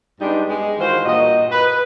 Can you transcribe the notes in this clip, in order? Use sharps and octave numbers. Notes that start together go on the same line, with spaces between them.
G2 G3 G#3 B3 D4 D#4
G#3
D#3 E3 F4 F#4 C5
G2 A#2 F#4 D#5
B4